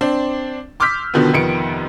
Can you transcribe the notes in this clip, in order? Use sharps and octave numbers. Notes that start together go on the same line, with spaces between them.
C4 D4
C6 D6 E6 F6 G6 B6
B2 D3 D#3 F3 B3
F2 C3 D#3 B3 C#7 D7